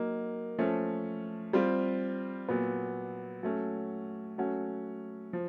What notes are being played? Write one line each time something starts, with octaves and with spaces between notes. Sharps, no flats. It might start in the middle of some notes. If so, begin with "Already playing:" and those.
Already playing: F#3 A#3 D#4
F3 A3 C#4
G3 C4 F4
A#2 F#3 B3
F#3 A3 C#4
F#3 A3 C#4 F#4
F3